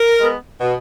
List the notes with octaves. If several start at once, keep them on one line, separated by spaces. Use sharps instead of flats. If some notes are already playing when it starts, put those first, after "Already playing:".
Already playing: A#4
G#3 B3
B2